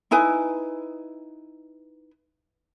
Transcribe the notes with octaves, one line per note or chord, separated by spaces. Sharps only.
D#4 E4 B4 G#5